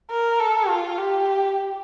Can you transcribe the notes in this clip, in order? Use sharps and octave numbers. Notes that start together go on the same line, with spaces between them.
A#4
A4
F4
G4